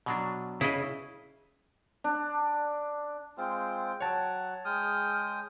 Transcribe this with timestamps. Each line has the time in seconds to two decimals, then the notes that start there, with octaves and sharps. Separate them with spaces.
0.06 B2 F#3 D4
0.61 C#3 E4 B4 D#5
2.04 D4
3.38 G#3 C4 F4 G5
4.01 F#3 C#5 F#5 A5
4.65 G#3 G5 D#6 F6